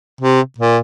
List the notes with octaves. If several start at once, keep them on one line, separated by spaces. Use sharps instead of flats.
C3
A#2